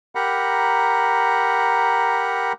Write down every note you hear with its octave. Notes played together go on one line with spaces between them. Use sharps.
G4 A#4 F#5 A#5 B5